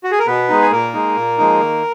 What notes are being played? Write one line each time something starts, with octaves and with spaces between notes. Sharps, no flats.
F#4
G#4
A#4
B2 B3 B4
G#3 D#4
G#4
A#2 A#3 A#4
G#3 D#4
A#2
F3 G#3 D#4
D#3